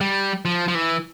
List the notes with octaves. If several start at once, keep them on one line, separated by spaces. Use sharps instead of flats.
G3
F3
F3
E3